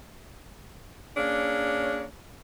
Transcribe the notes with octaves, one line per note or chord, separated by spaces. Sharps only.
A#3 C#4 D4 G#4 C#5